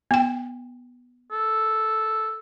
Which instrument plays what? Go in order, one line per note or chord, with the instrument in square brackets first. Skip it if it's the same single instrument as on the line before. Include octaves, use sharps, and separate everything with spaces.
[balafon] B3 G5
[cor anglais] A4